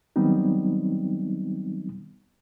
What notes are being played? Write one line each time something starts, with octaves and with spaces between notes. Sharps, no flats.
D#3 F#3 G3 B3 C4 D#4